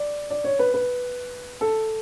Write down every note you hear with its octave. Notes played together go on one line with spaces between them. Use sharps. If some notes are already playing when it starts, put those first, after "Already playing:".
Already playing: D5
D5
C#5
B4
B4
A4